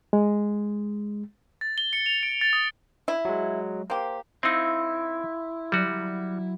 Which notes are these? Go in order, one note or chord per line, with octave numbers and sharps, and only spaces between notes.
G#3
A6
G7
C#7
F7
D7
A6
D#6
E4
F#3 G#3
A#3 G4 C5
C4 D#4 E4 F5 C6 E6 G6
F#3 G3 F#4 D5 D#7